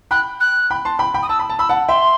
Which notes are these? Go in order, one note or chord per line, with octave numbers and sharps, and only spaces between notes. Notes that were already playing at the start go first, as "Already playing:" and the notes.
G5 B5 F#6
F#6
G5 B5
A5 C6
G5 B5
G5 B5
D#6
A5 E6
B5
A5
B5 E6
F#5 A5
E5 G5 C6